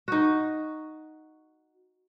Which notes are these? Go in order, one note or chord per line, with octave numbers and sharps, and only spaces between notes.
D#4 F#4